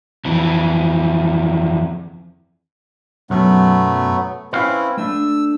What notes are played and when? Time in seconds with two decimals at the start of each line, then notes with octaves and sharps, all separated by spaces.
0.25 F2 E3
3.30 B1 F#2 F#3 A3 B3
4.53 C4 C#4 E4 B4 F5
4.97 A3 D4 E6